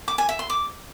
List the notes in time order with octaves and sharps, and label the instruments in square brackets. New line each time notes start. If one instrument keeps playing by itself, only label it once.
[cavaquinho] D6
G#5
E5
C6
D6